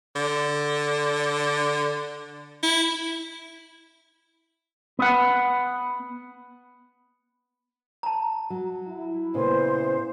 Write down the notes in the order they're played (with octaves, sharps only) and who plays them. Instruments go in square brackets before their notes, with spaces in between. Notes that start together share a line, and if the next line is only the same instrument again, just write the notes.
[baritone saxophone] D3
E4
[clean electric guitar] B3 F#5
[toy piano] A5 A#5
[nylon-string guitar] F#3
[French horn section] E4
[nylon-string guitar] A#2 C#3 B3 [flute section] C5